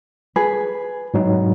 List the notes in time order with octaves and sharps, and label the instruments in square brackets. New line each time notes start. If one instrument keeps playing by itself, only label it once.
[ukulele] G#4 B4
[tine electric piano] G#2 F#3 D#4